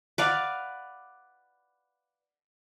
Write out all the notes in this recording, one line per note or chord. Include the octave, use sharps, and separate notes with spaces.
B4 D5 F5 F#5